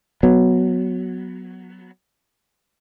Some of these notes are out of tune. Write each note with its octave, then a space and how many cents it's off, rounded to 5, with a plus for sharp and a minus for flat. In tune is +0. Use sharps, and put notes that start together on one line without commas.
F#3 +0 B3 +0